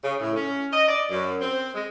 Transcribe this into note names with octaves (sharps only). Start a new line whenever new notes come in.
C#3
A2
C#4
D#5
D5
F#2
C4
G#3